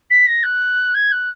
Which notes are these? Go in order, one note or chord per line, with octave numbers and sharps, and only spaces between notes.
B6
A#6
F#6
G#6
F#6